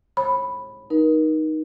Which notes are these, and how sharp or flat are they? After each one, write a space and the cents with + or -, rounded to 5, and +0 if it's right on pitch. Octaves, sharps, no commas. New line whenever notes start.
C#5 -45 B5 +0
D#4 +0 A#4 +35